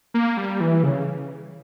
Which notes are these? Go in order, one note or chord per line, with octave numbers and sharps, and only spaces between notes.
A#3
G3
E3
C#3